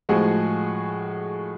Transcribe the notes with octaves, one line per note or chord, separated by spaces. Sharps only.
A2 F3 G#3 F#4 G#4